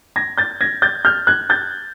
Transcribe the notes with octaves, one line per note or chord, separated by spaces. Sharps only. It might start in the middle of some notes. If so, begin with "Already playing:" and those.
G#6 A#6
G6 A6
G#6 A#6
G6 A6
F6 G6
F#6 G#6
G6 A6